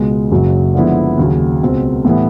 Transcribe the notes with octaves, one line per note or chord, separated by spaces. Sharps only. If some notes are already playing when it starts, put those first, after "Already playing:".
Already playing: C#2 B2 G#3
F#1 F#2 C#3 F#3
D3 F3 G#3 B3 E4
D#2 C#3 F#3
C#2 B2 G#3 C4
A2 E3 G3 B3 E4